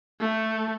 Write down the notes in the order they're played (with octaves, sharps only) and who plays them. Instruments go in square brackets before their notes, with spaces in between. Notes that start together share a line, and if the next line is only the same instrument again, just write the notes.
[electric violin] A3